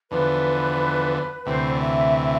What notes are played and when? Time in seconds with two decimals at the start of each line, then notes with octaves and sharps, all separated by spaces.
0.10 E2 D3 F3 B4
1.46 D2 C3 E3 C5
1.65 C5
1.72 D5
1.79 E5